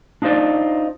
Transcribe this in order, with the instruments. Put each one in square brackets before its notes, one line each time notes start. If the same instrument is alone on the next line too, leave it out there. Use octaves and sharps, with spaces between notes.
[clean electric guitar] D4 D#4 F4 C5 D5